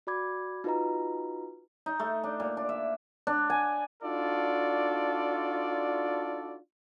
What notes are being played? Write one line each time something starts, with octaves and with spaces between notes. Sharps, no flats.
F#4 D5 B5 D6 G#6
D#4 F4 F#4 B4 D#5 A#5
D#4
A3
D4
A#2
D4
E5
D4
G#5
D4 D#4 F4 F#4 A4 D5